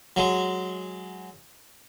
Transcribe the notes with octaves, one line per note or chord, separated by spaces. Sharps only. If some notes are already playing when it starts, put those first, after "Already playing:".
F#3 G#3